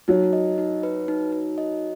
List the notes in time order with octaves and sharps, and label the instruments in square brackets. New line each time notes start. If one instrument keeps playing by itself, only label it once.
[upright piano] F#3 [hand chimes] D#4
[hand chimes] D#5
D#4
B4
D#4
D#4
D#5